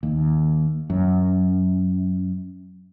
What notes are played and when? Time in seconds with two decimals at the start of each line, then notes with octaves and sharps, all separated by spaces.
0.03 D#2
0.90 F#2